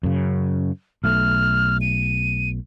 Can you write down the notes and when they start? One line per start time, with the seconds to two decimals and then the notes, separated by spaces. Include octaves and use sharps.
0.03 F#2 C#3
1.04 B1 A3 F6
1.81 D#7